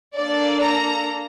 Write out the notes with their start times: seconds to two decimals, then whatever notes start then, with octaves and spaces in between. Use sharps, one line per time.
0.16 A#3 D4 A4 D5
0.62 A#5